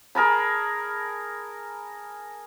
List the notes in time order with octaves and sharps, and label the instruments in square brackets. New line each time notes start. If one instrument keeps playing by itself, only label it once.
[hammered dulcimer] G#4 A#4 A5 B5